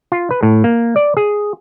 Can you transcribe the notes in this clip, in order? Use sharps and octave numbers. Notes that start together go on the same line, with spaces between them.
F4
B4
A2
A#3
D5
G#4